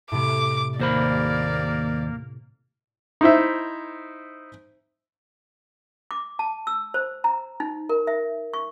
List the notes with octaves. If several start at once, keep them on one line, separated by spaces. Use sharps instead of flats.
A2 C3 D6 D7
D#2 A#3 C5 D5 B5
D#4 E4 C5 E5
D6
A5
E6
C5
A#5
D#4
A#4
E5
C#6